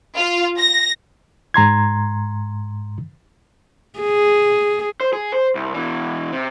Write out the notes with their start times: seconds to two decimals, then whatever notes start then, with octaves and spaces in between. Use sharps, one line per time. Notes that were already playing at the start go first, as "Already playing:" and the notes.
0.16 F4
0.59 A#6
1.54 G#2 A#5 C6 G#6
3.99 G#4
5.01 C5
5.13 G#4
5.34 C5
5.55 C2
5.74 B2 E3
6.32 C3